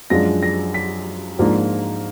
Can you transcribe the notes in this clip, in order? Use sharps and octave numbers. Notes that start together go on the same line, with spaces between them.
F#2 F3 G#3 D4 A#6
A#6
B6
G#2 F3 A#3 D4 F4